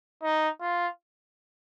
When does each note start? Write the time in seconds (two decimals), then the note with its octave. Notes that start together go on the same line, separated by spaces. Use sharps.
0.23 D#4
0.61 F4